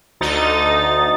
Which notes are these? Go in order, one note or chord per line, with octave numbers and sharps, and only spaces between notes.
D2 D#4 A6